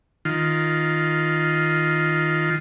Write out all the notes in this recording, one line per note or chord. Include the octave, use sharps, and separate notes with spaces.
D#3 F4